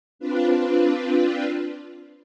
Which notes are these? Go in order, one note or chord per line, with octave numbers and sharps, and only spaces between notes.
C4 D4 F4 B4